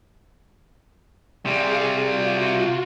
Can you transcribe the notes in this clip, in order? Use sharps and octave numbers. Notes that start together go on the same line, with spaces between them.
C3 G3 G#4 F5
F4 F#4